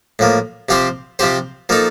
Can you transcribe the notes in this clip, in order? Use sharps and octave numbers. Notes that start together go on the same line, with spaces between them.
A2 F3 A#3
C3 F3 C4 G4 C5
C3 F3 C4 G4 C5
F3 A#3 D#4 A4